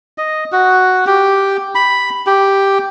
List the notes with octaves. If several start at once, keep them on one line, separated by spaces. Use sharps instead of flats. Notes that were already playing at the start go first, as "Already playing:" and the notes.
D#5
F#4
G4
B5
G4